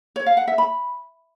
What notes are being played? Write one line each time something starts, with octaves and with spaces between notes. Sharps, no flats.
C#5
F5
F#5
E5
B5